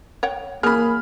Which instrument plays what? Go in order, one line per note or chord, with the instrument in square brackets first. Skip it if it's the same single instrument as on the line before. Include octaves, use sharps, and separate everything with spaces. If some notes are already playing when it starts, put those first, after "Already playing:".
[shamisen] C#5 F#5 G5
[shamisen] E3 F#3 [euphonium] A#3 [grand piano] G#4 [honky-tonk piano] B5 F6